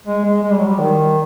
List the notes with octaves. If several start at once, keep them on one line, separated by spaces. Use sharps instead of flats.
G#3
G#3
G#3
G3
F#3
G3
D#3